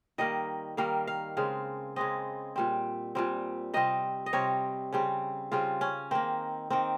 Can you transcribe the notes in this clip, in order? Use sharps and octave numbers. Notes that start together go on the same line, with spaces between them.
D#3 G3 A#3 D#5
D#3 G3 A#3 F5
F5
C#3 G#3 C4 F5
C#3 G#3 C4 D#5
A#2 G3 C4
A#2 G3 C4
C3 G3 C4 D#5
D#5
C3 G3 C4 C#5
C#3 G3 C4
C#3 G3 C4 F4
C#4
D#3 A#3 C4
D#3 A#3 C4